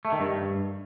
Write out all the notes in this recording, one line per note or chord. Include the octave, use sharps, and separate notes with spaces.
A3
D#3
G2